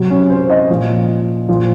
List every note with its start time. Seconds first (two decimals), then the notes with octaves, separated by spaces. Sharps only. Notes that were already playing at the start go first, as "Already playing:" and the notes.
Already playing: C3 F#3
0.10 C#4
0.30 C5
0.50 D#5
0.70 A#2 F3
1.49 A#2 F3